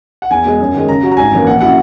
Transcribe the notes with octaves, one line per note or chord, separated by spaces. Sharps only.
F#5
E2 G#5
B2 G#3
F#2
D#3 G#3
C#3 A#5
F#3 C#4 F#4
A#5
G#1 G#5
F#2 E3 A#3
A#1 F#5
F#3 C#4 E4 F#5